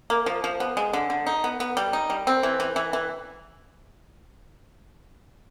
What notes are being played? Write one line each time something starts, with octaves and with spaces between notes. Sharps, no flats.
A#3
F3
F3
B3
G#3
D3
D3
D#4
B3
B3
G3
D#4
G3
C4
E3
E3
E3
E3